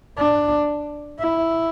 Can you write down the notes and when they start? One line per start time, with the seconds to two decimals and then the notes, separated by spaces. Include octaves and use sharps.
0.18 D4
1.19 E4